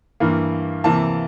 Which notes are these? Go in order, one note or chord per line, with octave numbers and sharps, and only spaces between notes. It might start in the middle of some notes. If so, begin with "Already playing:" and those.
G2 E3 A#3
C3 E3 A#3 A5